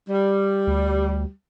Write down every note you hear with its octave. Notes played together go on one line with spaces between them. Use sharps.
G3
D2